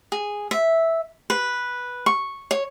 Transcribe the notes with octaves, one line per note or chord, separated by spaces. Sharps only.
G#4
E5
B4
C#6
C#5